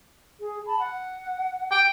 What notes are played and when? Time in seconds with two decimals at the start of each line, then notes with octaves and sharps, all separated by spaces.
0.39 G#4
0.66 A5 B5
0.79 F#5
1.71 G5